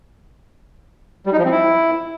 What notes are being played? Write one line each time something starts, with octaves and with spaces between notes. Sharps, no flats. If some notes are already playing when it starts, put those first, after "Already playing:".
G3
D#4
F3
C4
E4